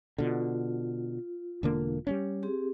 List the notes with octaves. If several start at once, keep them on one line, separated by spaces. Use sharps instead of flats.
B2 D3 F4
E1 D3 A#3
G3 A#3 C#4
C4 G4 G#4